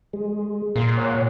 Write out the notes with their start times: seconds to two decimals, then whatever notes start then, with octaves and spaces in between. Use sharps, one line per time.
0.13 G#3
0.76 A#2 C6
0.97 C#5 F#5